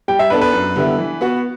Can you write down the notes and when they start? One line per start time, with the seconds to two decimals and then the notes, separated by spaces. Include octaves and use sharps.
0.08 G3 G5
0.19 E5
0.30 B3 D4 A4 B4
0.41 B4
0.53 F#2
0.76 D3 G3 B3 E4
0.98 E3
1.21 B3 F#4